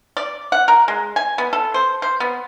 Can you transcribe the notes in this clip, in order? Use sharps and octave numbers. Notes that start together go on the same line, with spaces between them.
D5
F#5
A#4
G#3
G#5
B3
A4
C5
C5
B3